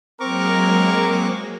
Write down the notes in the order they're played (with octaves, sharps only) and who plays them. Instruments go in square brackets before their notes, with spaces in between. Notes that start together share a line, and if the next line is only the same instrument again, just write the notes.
[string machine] F#3 G#3 A#3 [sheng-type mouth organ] C4 C#6 D6 [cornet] A#4